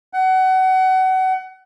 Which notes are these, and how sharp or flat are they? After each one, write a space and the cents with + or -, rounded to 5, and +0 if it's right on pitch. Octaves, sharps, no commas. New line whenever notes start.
F#5 +25